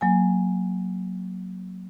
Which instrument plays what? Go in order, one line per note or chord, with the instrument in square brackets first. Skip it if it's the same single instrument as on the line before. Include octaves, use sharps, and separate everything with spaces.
[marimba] F#3 A#3 G#5